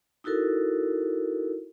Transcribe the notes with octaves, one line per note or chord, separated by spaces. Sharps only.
D#4 E4 F#4 A4 A#4